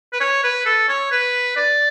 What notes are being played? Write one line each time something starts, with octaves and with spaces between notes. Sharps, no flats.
B4
C#5
B4
A4
C#5
B4
D5